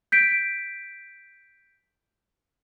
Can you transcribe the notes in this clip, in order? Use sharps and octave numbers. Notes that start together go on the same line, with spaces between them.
G6 B6 D7